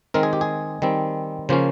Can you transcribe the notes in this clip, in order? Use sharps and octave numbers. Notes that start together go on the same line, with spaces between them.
D#3 G#3 C4 A#4
G#4
G4
G#4
D#3 G3 C4
C#3 F3 A#3 C#4 C5